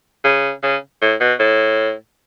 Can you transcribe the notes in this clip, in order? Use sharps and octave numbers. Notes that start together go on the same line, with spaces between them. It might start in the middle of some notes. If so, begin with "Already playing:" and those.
C#3
C#3
A2
B2
A2